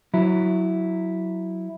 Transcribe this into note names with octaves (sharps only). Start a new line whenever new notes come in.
F#3 E4